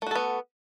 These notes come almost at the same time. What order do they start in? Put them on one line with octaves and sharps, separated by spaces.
A3 F#4 A4 B3